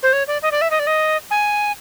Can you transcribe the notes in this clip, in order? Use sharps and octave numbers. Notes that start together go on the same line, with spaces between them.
C5
C#5
D5
D#5
D5
E5
D#5
D5
D#5
G#5